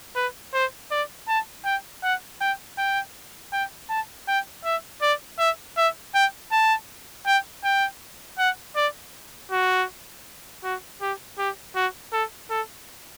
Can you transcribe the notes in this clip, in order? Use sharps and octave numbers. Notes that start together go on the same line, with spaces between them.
B4
C5
D5
A5
G5
F#5
G5
G5
G5
A5
G5
E5
D5
E5
E5
G5
A5
G5
G5
F#5
D5
F#4
F#4
G4
G4
F#4
A4
A4